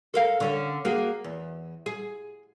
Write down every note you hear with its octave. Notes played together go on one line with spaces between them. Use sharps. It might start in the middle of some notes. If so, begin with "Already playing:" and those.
A4 A#4 F5
D3 C#4 A4
A#3 F#4 G#4
E2
G#4